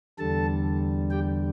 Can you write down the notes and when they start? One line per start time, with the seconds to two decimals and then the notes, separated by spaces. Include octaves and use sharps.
0.19 E2 D3 G3 A4 A5
1.11 G4 G5